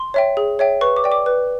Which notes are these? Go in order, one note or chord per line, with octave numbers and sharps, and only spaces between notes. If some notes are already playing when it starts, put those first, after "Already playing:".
Already playing: C6
C#5 E5 G5
G#4
C#5 E5 G5
B4 C#6
D6
D5 G5
D6
B4